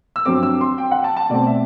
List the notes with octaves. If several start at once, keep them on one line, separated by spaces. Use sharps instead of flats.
E6
G2 F#3 C4 D6
E6
C6
G5
F#5
A5
A5
B2 A3 C4 D5
E5